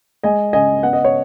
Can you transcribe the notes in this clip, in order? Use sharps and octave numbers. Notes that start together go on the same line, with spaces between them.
G#3 D#5 G#5
C#3 D#5 G#5
B3 F#5
D#5
C#5